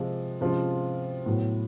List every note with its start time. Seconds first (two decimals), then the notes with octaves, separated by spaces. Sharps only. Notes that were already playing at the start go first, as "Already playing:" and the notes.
Already playing: C3 F3 G#3
0.41 C3 F3 G#3 C#4 F4
1.26 A2 F#3 B3